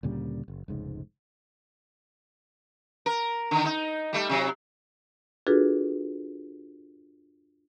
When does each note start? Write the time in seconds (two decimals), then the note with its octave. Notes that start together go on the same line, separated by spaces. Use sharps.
0.03 D2 A#2 C#3 G3
0.48 F#1
0.68 F1 C#2 G#2
3.06 A#4
3.51 D3 D#3
3.65 D#4
4.13 G3 A3
4.29 C3 F#3
5.47 D4 F4 F#4 G#4 A4 B4